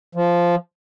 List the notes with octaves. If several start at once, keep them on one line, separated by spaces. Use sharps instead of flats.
F3